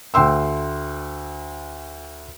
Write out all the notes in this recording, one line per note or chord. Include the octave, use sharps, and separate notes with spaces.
D2 G5 C6 E6